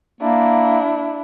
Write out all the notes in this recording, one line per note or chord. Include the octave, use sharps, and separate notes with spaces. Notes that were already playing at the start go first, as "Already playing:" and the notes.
A#3 D4 E4